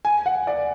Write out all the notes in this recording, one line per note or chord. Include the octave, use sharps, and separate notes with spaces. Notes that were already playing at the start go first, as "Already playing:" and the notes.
G#5
F#5
D5